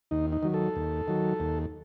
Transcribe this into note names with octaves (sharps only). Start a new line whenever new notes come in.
D#2 D#4
D#4
D#3 F#3
A4
D#2
D#3 F#3
D#2